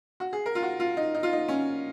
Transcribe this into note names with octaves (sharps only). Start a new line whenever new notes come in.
F#4
G#4
A#4
F4
F#4
F4
D#4
D#4
F4
D#4
C#4